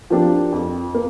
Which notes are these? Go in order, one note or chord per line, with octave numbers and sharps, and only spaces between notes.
F3 A#3 D4 G4
F2
A#3